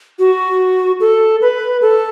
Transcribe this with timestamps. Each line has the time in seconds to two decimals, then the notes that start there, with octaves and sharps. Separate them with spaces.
0.19 F#4
1.00 A4
1.41 B4
1.82 A4